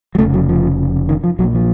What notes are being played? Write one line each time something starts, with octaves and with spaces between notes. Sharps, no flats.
F#3
F2 C#3 A3
F1
F#3
F3
D#3
F3
A#1 A#2 F#3
F3